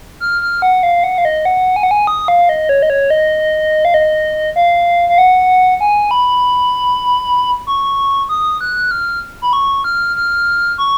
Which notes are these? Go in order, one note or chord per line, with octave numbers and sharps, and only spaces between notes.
F6
F6
F#5
F5
F#5
F5
D#5
F#5
G#5
F#5
G#5
D#6
F5
D#5
C#5
D#5
C#5
D#5
F5
D#5
F5
F5
F#5
G#5
B5
C#6
D#6
F#6
F6
B5
C#6
F6
F6
C#6